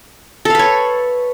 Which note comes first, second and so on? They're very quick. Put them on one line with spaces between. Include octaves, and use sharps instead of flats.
A4 F5 B4 C#5